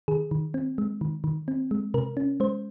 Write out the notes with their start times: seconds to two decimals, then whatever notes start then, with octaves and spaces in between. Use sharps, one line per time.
0.08 D#3 G#4
0.31 D#3
0.54 C4
0.78 G#3
1.01 D#3
1.24 D#3
1.48 C4
1.71 G#3
1.94 C3 A#4
2.17 C#4
2.40 G#3 C5